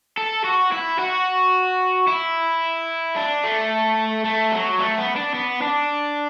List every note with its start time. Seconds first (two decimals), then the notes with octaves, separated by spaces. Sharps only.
0.17 A4
0.44 F#4
0.72 E4
0.99 F#4
2.07 E4
3.16 D4
3.44 A3
4.25 A3
4.53 F#3
4.80 A3
4.98 B3
5.16 D4
5.34 B3
5.62 D4